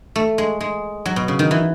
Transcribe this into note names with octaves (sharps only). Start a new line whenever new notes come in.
A3
G#3
G#3
F#3
B2
C#3
D#3
E3